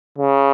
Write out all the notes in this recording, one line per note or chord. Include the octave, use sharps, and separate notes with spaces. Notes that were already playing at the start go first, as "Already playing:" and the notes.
C#3